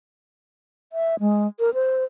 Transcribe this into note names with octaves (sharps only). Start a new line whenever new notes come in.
E5
G#3
A#4
C5